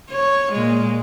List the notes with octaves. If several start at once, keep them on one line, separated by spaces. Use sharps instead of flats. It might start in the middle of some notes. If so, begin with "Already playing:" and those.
C#5
A#2 G#3